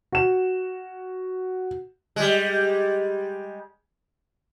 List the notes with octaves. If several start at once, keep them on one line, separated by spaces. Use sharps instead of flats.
F#4 E7
G3 G#3